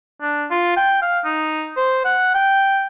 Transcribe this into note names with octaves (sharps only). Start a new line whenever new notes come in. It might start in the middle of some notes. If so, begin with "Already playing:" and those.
D4
F4
G5
F5
D#4
C5
F#5
G5